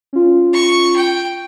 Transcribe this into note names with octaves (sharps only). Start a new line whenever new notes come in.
C#4 F4
C#6
G5